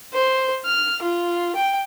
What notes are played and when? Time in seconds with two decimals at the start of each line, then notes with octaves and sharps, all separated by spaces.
0.13 C5
0.66 F6
1.03 F4
1.55 G5